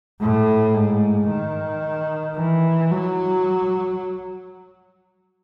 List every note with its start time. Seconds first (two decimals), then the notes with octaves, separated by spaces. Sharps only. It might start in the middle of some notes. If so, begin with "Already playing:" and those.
0.20 A2
0.75 G#2
1.28 D#3
2.36 E3
2.91 F#3